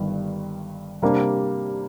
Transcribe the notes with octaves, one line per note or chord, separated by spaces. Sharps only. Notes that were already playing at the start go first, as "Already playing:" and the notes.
Already playing: G1 G2 D#3
C3 G3 A#3 D4 G4